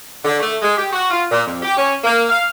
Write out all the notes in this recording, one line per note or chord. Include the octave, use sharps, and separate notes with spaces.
D3
A3
G#3
G4
F#4
F4
A#2
F2
G4
C#4
A#3
F5